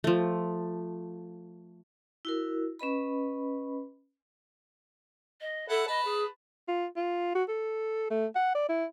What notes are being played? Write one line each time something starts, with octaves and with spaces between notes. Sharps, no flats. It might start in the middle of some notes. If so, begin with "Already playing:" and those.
F3 A3
E4 F#4 A#4
C#4 B4 D#5 B5
D#5
E4 A4 F#5 A5
B4 D#5 A5 B5
G#4
F4
F4
F#4
A4
A3
F#5
D5
E4